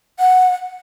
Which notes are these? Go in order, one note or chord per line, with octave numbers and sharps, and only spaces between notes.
F#5